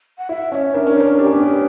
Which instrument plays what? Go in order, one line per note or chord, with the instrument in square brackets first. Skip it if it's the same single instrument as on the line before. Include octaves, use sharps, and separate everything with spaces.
[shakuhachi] F#5
[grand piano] E4 [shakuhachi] F#5
[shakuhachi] E5
[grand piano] C#4 [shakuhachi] E5
[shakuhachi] C#5
[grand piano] D4 [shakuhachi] A#4
[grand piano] C#4
[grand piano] D4 [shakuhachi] C#5
[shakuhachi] A#4
[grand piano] D4 [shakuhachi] G4
[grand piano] C#4
B3
C#4
B3